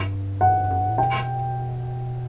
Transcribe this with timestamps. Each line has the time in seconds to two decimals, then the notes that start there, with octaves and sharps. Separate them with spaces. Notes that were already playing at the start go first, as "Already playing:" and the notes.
Already playing: G2
0.41 F#5
0.70 F#2
0.80 G2
0.89 A2
0.98 B2 G5